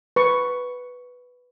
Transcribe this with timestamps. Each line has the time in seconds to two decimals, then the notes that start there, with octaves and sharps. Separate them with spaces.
0.16 B4 C#6